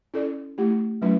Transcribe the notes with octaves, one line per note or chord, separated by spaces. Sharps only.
C#4 E4 A4 D5
A3 E4 G4
F#3 A3 C#4 E4 B4